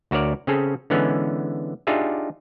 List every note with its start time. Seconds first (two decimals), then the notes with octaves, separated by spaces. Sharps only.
0.11 D2 F#4 A#4 C#5 D5
0.47 C#3 C4 C#4 G#4 A4
0.90 D3 E3 G#3 B3 C#4
1.87 D4 D#4 F4 G4 G#4 E5